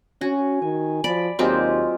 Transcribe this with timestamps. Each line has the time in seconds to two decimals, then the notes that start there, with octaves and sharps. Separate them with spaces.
0.21 C#4 F#4 G#5
0.62 D#3 G#5
1.04 F3 D5 B5
1.39 D#2 F#3 G#3 A#3 C4 F4 G4